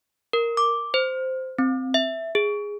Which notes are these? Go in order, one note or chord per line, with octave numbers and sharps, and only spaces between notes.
A#4
D6
C5
C4
E5
G#4